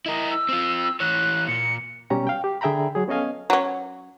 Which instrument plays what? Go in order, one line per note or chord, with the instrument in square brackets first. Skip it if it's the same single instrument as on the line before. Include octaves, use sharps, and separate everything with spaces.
[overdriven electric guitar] E4 A#4 [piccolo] D#5
[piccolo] E6
[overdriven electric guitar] C4 F4
[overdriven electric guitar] E3 C#5 [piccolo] F#6
[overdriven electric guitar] A#2 [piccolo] C#7
[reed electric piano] B2 G3 C#4 G4 A#5
F5 G5
G4
D3 G#4 E5 G5 A#5 B5
F#3 G#4
B3 C#4 A4 D#5 F5 G#5
[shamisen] F#3 C#4